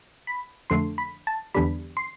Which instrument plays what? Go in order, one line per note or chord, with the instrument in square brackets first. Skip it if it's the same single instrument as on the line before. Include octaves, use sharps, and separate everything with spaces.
[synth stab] B5
F2 D3 A3 C6
B5
A5
E2 D3 G3 B5
C6